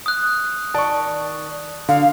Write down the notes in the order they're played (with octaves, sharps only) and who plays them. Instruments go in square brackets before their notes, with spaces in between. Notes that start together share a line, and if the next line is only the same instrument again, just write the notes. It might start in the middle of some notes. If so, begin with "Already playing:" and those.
[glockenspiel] D#6 F#6
[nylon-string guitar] D#3 D5 [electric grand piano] A5 C#6
[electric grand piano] D3 [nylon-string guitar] F#4 [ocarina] F5